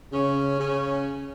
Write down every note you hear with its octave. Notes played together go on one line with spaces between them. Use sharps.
C#3 C#4
C#3 C#4